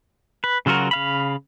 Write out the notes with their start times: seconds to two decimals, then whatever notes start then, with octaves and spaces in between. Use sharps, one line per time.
0.44 B4
0.66 C#3 F#3 F4 F#4 A#4
0.91 C#3 F5 B5